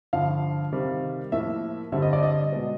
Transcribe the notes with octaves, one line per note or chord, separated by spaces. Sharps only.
G2 D3 F3 F5
C3 D#3 G3 C4
A2 F3 A#3 E5
G2 D3 G3 C4 E5
D#5
D5
D#5
B2 G#3 B3